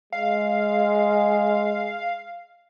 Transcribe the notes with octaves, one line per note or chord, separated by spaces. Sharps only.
G#3 F5